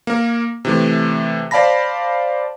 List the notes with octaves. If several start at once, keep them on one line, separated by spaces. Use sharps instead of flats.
A#3 A#4
C3 E3 A3
C5 D5 F5 A5 B5 A#6